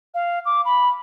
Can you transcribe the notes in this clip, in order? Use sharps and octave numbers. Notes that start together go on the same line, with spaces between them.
F5
D6
B5